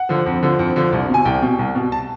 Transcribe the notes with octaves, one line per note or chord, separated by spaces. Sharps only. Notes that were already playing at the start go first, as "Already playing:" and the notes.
Already playing: F#5
D3 F3
F2
D3 F3
F2
D3 F3
C2
B2 G#5
C2 G5
B2
C2
B2
A5